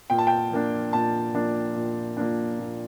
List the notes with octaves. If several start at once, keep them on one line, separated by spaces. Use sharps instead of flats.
A#2 G5
A5
G5
F3 A#3 D4
A#2 A5
F3 A#3 D4
A#2
F3 A#3 D4
A#2